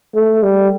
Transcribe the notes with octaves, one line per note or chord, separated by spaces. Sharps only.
A3
G3